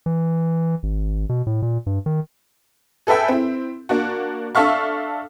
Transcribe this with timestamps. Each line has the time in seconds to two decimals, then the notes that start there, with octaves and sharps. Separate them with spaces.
0.06 E3
0.83 G#1
1.29 B2
1.47 A2
1.62 A#2
1.86 G2
2.06 D#3
3.07 G#4 A4 B4 E5 G5
3.28 C4 E4
3.89 A#3 D4 F#4
4.55 D4 A4 E5 F5 C#6